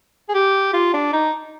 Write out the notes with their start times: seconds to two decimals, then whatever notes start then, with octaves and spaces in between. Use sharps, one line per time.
0.29 G#4
0.34 G4
0.73 F4
0.93 D4
1.13 D#4